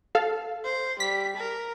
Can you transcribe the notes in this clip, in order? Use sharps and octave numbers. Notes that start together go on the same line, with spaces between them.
A4 F5
C5
G3 B6
A#4